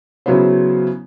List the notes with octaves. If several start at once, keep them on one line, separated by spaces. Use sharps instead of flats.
C#3 F#3 B3 E4 C5